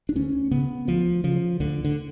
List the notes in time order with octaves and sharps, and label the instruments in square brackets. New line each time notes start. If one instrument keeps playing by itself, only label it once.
[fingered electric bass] D4
D2 C#4
C#3 B3
D2 F3
C#3 F3
D2 D3
D3